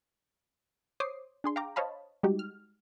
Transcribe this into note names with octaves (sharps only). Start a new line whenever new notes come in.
C5 C#5 D6 D#6 C7
D4 G#4 C6
F5 G5 A#5 D6
C5 C#5 D#5 F5 A5 B5
G3 G#3 D#4 F#4 G4
F6